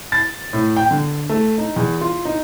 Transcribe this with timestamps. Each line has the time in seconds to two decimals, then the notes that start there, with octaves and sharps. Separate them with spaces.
0.12 A6
0.53 A2
0.76 G5
0.91 D3
1.29 A3
1.58 D#4
1.76 E2
2.01 F4
2.25 D#4